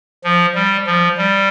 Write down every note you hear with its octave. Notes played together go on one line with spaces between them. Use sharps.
F3
G3
F3
G3